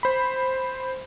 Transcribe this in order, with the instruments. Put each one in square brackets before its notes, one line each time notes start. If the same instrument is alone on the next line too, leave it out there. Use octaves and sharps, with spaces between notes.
[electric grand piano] C5 B5